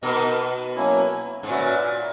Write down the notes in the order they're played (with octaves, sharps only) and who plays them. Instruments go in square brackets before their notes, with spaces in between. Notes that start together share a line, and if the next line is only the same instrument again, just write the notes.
[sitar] B2 [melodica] B3 D#4 A#4 D#5
[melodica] F#3 A#3 C#4 E4
[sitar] G#2
[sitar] A#2 [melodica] C#4 F#4 B4 E5